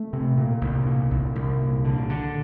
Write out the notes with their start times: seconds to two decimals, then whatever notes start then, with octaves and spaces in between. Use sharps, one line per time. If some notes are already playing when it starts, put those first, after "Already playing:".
Already playing: A3
0.13 C3
0.38 A#2
0.61 C2
0.86 A#2
1.11 C2
1.35 C2
1.61 A#2
1.84 D3
2.09 D3